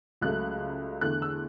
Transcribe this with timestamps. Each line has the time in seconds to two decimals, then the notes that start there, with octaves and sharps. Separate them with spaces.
0.21 C#2 C#3 F#3 A3 F#6
1.01 E2 D3 A3 F#6
1.22 E6